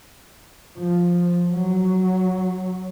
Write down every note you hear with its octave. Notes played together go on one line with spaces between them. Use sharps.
F3
F#3